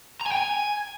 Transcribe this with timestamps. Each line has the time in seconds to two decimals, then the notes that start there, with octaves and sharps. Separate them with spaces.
0.21 A#5
0.26 G#5
0.32 G5
0.37 G#5